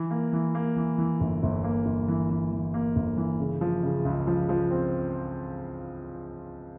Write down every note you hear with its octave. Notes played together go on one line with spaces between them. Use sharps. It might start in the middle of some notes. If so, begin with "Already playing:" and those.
Already playing: E3
A#3
E3
A#3
E3
E3
G1
G1
A#3
G1
E3
E3
E3
A#3
G1
E3
C#3
F3
C#3
C#2
F3
F3
C4